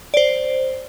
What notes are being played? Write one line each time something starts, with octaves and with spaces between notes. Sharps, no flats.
C5 D5